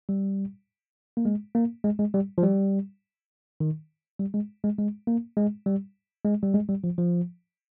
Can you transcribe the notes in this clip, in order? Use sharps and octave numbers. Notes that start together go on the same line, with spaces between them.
G3
A#3
G#3
A#3
G#3
G#3
G3
F3
G3
D#3
G3
G#3
G#3
G#3
A#3
G#3
G3
G#3
G3
G#3
G3
F3
F3